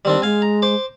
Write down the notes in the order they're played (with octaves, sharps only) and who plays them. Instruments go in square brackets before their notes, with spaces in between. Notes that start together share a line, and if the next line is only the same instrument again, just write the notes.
[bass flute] D#3 [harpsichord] G3 C4 D4
[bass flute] G#3 [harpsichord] F5 G#5
[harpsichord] A#5
C5 D6